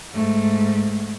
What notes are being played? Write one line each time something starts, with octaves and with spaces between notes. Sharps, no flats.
G#2 A3